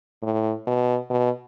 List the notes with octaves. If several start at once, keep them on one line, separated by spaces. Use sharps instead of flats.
A2
B2
B2